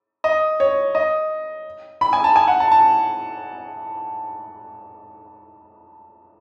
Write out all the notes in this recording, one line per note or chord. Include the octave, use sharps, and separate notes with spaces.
D#5
C#5
D#5
B5
G#5
A5
G#5
F#5
A5
A5